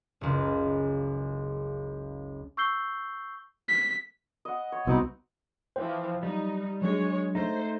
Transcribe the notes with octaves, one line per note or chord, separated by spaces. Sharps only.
F#1 C#2
C#6 E6 G6 C7 G7
B6
D#5 F#5
C#5
C2 B2 C4 D#4 B4
E3 F3 C5 G5
F#3 G3 D#4
F#3 G#3 D4 C#5
A3 D#4 C5